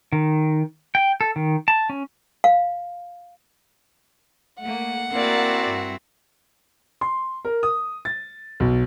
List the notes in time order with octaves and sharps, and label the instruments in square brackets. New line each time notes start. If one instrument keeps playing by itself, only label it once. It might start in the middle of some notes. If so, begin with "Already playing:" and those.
[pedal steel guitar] D#3
G5
A4
D#3
A5
C#4
[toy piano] F5
[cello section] A3 A#3 [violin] F#5
[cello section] A#3 [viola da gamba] C4 E4 F#4 [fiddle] A#4 D5
[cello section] G2
[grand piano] C6
A#4
D#6
A6
B1